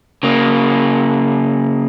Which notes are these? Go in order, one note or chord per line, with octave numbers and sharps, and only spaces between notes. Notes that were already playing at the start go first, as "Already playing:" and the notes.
C#3 A#3